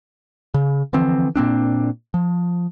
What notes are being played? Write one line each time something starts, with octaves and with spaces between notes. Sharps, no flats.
C#3
D3 E3 F3 C4
A#2 A#3 C4 D4
F3